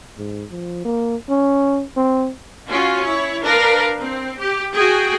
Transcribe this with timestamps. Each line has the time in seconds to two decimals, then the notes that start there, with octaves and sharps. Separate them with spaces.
0.18 G#2
0.51 F3
0.85 A#3
1.30 C#4
1.97 C4
2.68 C#4 F4 F#4
3.01 E4 C#5
3.41 D4 A#4 B4 F5
4.01 C4
4.39 G4
4.73 F#4 G#4 G5